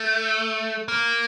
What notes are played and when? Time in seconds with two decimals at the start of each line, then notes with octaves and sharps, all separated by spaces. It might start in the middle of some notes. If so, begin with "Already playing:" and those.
Already playing: A3
0.88 A#3